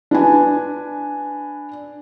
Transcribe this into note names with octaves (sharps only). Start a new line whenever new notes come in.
D4 B4 G#5